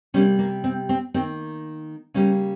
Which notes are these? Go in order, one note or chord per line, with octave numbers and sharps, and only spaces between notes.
C3 G3 A#3 C#4
A#3
C4
C4
D#3 A#3 C4
C#3 G3 A#3 C#4